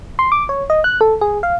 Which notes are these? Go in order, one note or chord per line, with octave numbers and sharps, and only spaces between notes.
C6
D6
C#5
D#5
F#6
A4
G#4
F5